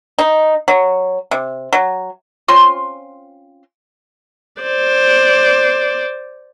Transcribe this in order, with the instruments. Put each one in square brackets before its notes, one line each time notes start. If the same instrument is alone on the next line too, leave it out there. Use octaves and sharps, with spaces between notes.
[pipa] D#4
F#3
C3
F#3
C4 C#4 F4 C6
[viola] C5 D5